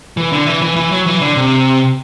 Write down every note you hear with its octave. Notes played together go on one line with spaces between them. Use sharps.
E3
D3
E3
E3
E3
F#3
E3
D3
C3